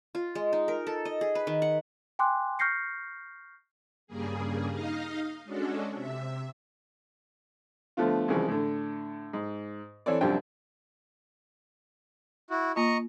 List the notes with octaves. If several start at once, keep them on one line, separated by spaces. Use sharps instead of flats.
F4
G#3
D#4
A#4
A4
D#5
G#4
B4
D#3
F#5
G5 G#5 C6 D6 F#6
C#6 F6 G6 A#6 C7 C#7
G2 C#3 G3 A#3 G#4
D#4 D#5 F5
G#3 C#4 D4 F#4 A4
C3 E5
D3 F3 A3 B3 F4
C2 C#3 E3 F3 G#3
A2 D3
G#2
E3 C4 A4 C#5 D5
C2 F#2 F3 G3 D4 G5
E4 F#4
A#3 F4 D#5 A#5 C#6